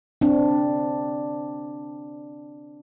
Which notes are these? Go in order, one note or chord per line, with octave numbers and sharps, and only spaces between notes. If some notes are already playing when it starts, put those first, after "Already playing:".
C4 D4